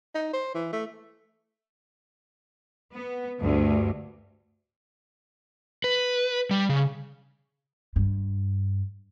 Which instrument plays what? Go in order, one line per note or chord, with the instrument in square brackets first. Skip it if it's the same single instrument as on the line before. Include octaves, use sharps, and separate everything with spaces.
[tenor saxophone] D#4
C5
E3
A3
[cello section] B3
D2 G2
[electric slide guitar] B4
G3
C#3
[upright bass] G2